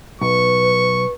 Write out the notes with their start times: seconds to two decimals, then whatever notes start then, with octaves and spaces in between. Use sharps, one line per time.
0.21 B1 B4 C#6